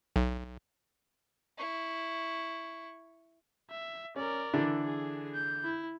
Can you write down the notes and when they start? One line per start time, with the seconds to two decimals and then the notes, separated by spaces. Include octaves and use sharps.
0.16 B1
1.58 E4 C#6
3.70 E5
4.16 C#4 A#4 D5
4.53 D3 E3 D4
4.85 G#4
5.35 G6
5.64 E4